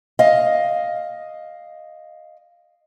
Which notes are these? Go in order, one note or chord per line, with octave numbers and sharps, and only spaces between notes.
D#5 F5